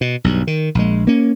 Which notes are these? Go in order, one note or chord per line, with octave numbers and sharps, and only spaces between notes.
B2
B1 G2
D#3
A#1 G#3
A#3 C#4